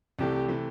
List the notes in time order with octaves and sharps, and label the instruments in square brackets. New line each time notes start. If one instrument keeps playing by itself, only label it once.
[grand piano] C2 C3 E3 A3 [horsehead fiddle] G4
[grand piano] C3 E3 A3